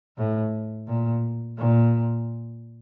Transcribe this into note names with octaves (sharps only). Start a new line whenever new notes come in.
A2
A#2
A#2